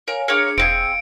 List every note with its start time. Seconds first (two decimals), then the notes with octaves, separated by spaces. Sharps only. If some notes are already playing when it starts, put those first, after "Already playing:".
0.08 A#4 C#5 F5 G#5
0.28 D4 G#4 A#4 C#5 F5 C#7
0.58 E1 C4 D#4 G#4 F5 D7